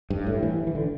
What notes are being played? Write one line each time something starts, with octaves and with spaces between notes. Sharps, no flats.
G2
A2
E3
E3
D3